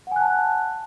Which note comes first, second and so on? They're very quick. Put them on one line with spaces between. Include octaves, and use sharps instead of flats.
F#5 G#5 F#6 A5